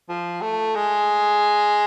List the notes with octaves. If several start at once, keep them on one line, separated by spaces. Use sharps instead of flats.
F3
A3
G#3